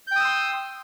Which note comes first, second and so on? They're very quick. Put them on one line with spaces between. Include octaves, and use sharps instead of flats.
G6 G5 D#6 E6 C6